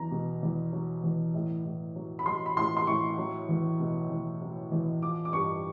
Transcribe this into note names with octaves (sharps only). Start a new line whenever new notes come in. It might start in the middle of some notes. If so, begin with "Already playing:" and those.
Already playing: E2 F#3 A#5
B2
E2
F#3
E2
A2
A2
F#3
B5
F#3 C6
B5
A2 C6
C6
A2 C#6
F#3
E2
B2
E2
F#3
E2
F3 D6
D6
G2 C#6